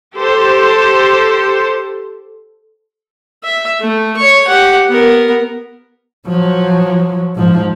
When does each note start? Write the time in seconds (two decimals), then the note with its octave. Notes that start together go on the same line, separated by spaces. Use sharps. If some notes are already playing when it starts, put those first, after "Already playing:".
0.17 G4 A4 C5
3.44 E5
3.80 A3
4.17 C#5 C#6
4.47 G4 F#5
4.88 B3 A#4
6.27 F3 F#3
7.35 G#2 F3